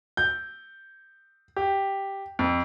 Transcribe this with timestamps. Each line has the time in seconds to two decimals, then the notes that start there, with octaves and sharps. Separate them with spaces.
0.17 G6
1.56 G4
2.39 F2